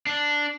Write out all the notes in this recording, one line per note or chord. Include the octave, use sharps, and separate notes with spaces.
D4